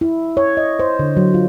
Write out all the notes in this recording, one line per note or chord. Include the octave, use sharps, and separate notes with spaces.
E4
C#5
D#5
C5
D3
F#3
F4